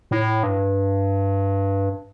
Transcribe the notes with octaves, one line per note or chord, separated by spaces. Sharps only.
A2
G2